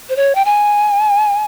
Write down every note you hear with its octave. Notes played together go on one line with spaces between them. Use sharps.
C5
C#5
G5
G#5